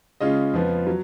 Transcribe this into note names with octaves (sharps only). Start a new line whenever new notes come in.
C#3 G#3 C#4 F4 D#5
F2 F3 B3 F4
F#3